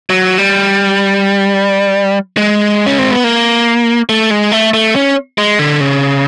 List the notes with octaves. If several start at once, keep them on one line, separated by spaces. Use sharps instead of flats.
F#3
G3
G#3
C#4
C4
B3
A#3
A3
G#3
A3
A3
C#4
G#3
D3
C#3